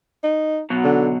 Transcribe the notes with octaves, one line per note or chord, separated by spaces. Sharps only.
D#4
B2 F#3
D3